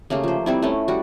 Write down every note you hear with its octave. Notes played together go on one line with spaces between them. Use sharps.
C#3 A3 A#3 G4
F3 C5
G3 C4 E4
A3 C#4
G3 F#4